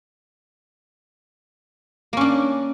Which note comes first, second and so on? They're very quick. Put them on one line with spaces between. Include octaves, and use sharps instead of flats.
A#3 C#4 D4